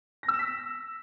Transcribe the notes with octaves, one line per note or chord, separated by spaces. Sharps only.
A#6
E6
E7
B6